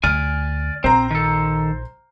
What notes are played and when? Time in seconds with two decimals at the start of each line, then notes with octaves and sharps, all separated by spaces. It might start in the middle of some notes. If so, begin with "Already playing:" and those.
0.04 D2 D5 G#5 F6
0.84 A#1 C4 C5 A#5
1.11 D#3 A4